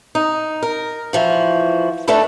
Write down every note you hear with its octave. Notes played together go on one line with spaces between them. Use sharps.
D#4
A#4
E3 F3 F#4
A3 D4 D#4 A4 B4